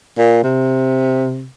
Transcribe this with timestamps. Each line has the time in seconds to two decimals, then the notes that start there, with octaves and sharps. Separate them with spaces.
0.18 A#2
0.43 C3